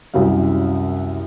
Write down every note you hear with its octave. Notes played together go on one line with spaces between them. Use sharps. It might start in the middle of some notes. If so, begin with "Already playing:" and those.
C2 F#2 G3 C#4 F5